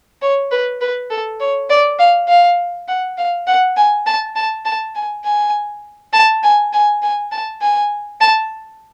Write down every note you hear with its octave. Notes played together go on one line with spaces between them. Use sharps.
C#5
B4
B4
A4
C#5
D5
F5
F5
F#5
F5
F#5
G#5
A5
A5
A5
G#5
G#5
A5
G#5
G#5
G#5
A5
G#5
A5